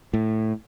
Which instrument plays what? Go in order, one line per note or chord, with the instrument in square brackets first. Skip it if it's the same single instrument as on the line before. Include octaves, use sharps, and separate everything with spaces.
[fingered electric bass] A2